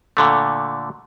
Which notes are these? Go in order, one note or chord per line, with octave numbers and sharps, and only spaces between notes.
A#2 D3 A3